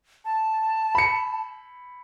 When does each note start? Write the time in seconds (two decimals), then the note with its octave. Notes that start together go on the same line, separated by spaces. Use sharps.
0.25 A5
0.95 B5 C#7